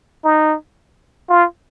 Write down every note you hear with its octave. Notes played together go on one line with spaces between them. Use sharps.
D#4
F4